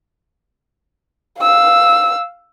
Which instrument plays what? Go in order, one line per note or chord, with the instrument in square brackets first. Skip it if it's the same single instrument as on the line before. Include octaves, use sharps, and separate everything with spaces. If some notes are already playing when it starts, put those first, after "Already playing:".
[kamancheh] F5 E6